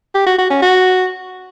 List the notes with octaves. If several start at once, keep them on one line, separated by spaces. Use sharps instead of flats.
G4
F#4
F#4
C#4
F#4